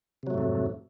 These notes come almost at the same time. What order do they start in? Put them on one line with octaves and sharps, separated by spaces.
C3 F#3 A3 G#2 F2